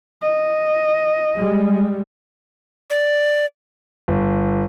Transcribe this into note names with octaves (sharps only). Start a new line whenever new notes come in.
D#5
G3 G#3
D5
G1